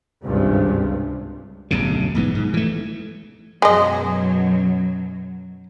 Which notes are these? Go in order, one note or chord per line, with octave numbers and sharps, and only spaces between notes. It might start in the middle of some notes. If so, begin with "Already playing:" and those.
G#1 C#2 G2 C3
D1 B1 G2 C#3
B1 G#2 E3 B3
G#2
E3 A3
F#2 B2 F#3 G#3 D#5